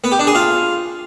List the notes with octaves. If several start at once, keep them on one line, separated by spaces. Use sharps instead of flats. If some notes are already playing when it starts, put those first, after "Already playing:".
B3
G4
D4
G#4
F4